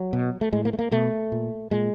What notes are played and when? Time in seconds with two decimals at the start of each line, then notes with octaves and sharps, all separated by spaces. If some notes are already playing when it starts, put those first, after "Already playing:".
Already playing: F#3
0.13 B2
0.41 A3
0.53 A2 G#3
0.65 A#3
0.73 A3
0.79 A#3
0.91 B2 A3
1.32 A#2
1.71 A#2 G#3